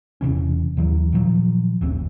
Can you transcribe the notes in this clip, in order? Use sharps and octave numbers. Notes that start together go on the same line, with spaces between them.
E1 C3 E3 C#4
D#2 E3 F#3
A#2 D#3 F3 F#3
F#1 D2 C4